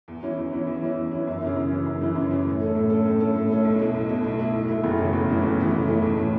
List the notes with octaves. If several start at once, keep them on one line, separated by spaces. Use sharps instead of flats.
E2
E3 C#4 E4
E2
E3 C#4 E4
E2
E3 C#4 E4
E2
E3 C#4 E4
F#2
C#3 E3
F#2
C#3 E3
F#2
C#3 E3
F#2
C#3 E3
A2
A3 C#4 A4
A2
A3 C#4 A4
A2
A3 C#4 A4
A2
A3 C#4 A4
B1
B2 A3 E4
B1
B2 A3 E4
B1
B2 A3 E4
B1
B2 A3 E4
F#1
E2 C#3 E3 A3
F#1
E2 C#3 E3 A3
F#1
E2 C#3 E3 A3
F#1
E2 C#3 E3 A3
B1
A2 E3 C#4